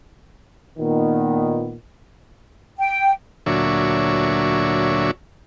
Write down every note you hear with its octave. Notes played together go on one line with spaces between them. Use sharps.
A#2 D#3 B3
G5
D2 A#2 F#3 D4 C#5 E5